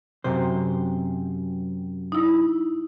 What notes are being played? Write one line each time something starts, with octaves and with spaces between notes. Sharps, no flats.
F#2 C3 C5
D#4 E4